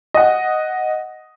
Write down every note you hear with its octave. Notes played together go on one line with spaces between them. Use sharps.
D#5 F#5